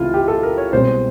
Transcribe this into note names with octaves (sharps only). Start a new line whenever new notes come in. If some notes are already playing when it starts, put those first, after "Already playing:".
Already playing: C#2 C3 E3 A3 E4 F4
G4
A4
A#4
C#5
C2 B2 G#3 C4 C5